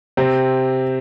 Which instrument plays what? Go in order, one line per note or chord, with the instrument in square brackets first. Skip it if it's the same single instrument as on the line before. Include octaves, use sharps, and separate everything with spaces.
[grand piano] C3 C4